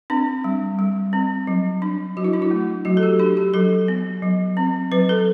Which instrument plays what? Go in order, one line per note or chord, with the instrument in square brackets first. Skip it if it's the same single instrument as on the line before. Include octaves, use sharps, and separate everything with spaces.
[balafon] C4 D4
G3
G3
C4
F#3
D4
F#3 F#4
E4
D4
E4
A3
F#3 F#4
A4
G4
D4 G4
G4
F#3 A4
B3
F#3
C4
F#3 B4
A4